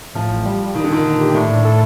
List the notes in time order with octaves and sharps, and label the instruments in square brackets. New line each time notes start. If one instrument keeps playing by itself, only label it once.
[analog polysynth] A2 [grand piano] F3
[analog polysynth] A1
G3
G3
[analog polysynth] A#2 [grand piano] D#3
[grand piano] D3
[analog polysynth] A#2 [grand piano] D#3
[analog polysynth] D3
G4
[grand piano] A2 [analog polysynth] D4
[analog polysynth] A2
A4